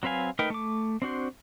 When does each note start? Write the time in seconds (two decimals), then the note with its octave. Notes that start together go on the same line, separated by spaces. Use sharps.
0.03 F#3 C4 B4 F5 G#5
0.39 A3 D#4 A#4 B4 G5
0.50 A3 D6
1.02 C4 D4 F#4 C5